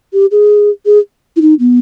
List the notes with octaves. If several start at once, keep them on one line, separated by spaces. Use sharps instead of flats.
G4
G#4
G#4
E4
D#4
B3